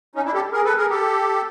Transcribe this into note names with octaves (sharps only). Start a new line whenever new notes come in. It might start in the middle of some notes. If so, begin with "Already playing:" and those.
C#4 D#4
D4 E4
G4 A4
G#4 A#4
A4 B4
G#4 A#4
G4 A4